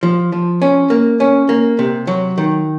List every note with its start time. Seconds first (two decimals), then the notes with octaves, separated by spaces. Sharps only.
0.03 F3
0.32 F3
0.62 C#4
0.90 A#3
1.20 C#4
1.49 A#3
1.79 C3
2.07 F#3
2.38 D#3